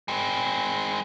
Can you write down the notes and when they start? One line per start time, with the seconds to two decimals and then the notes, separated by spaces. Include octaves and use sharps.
0.08 G#3 C4